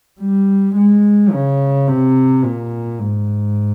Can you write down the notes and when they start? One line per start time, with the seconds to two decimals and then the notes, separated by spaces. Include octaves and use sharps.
0.21 G3
0.76 G#3
1.33 C#3
1.87 C3
2.44 A#2
2.99 G#2